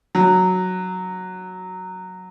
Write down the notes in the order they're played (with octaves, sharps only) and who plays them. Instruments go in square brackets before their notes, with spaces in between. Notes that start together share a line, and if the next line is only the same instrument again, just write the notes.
[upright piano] F#3